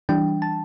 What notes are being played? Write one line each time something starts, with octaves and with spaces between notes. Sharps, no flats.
E3 G3 D4 G5
A5